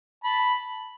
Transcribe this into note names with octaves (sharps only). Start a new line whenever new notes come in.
A5 B5